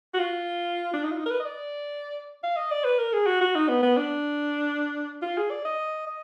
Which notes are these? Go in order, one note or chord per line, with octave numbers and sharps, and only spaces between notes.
F#4
F4
D4
D#4
F4
D#4
A#4
B4
D#5
D5
F5
D#5
D5
B4
A#4
G#4
F#4
F#4
D#4
B3
B3
D4
F4
G#4
D5
D#5
D#5